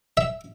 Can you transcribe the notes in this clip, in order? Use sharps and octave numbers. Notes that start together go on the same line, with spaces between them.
E5